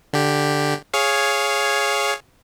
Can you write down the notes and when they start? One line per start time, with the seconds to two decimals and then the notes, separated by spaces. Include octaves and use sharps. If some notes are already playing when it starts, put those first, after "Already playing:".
0.13 D3 G4
0.94 G#4 C#5 F5